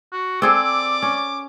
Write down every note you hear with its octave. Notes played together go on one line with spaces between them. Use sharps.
F#4
C4 G#4 A4 D5 D6
C#4